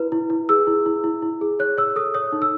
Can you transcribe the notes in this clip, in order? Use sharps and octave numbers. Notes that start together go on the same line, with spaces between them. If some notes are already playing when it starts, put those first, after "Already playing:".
Already playing: E4 B4
E4
E4
G#4 E6
E4
E4
E4
E4
G#4
C#5 F#6
C#5 E6
A4 D#6
C#5 D#6
D#4
E6